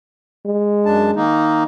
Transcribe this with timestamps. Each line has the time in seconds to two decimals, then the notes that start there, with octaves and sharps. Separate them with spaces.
0.46 G#3
0.85 F#2 D4 A5
1.16 D#3 A#3 D#4